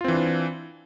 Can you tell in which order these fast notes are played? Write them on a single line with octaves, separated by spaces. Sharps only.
F4 C4 E3 D4